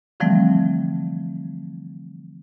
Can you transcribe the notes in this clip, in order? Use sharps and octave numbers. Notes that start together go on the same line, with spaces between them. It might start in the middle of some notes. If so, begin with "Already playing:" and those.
D3 E3 F3 G3 A3 C4